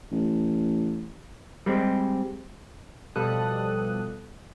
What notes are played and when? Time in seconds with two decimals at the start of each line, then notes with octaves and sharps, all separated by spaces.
0.11 A1
1.66 G3 G#3 C4
3.16 B2 F3 G3 A4 D#6 F#6